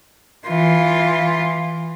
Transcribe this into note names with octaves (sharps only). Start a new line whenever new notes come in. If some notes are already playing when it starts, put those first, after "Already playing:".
E3 F4